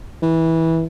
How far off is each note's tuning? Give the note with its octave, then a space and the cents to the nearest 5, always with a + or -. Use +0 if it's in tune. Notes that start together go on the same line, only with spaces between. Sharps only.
E3 -15